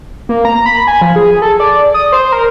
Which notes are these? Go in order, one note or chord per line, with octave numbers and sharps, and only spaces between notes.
A#3
A#5
B5
G#5
F3
G#4
A4
D5
D#6
C5
A#4